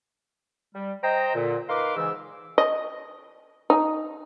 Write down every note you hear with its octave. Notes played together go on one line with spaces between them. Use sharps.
G3
C5 D#5 G5 A#5
A#2 D3
D#4 A#4 B4 F5 C6 D6
G#2 C#3 E3 E6
D#5
D#4